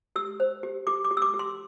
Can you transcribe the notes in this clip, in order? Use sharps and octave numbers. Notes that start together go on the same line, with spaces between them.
G4 E6
C5
G4
G4 D6
D6
G4
E6
D6
G4
C6